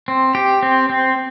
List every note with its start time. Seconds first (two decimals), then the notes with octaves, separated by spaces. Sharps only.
0.08 C4
0.35 G4
0.63 C4
0.89 C4